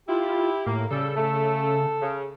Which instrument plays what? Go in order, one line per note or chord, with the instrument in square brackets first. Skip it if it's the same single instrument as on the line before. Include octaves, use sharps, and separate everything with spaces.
[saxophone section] E4 [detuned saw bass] F4 [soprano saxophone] G4
[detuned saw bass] A2 [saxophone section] A#3
[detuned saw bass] C#3 [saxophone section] G3 A4
[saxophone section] A3 [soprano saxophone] A4
[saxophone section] C#3